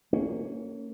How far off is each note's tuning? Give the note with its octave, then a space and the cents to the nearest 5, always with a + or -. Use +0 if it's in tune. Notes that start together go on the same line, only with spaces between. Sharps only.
A#3 -25 C#4 +0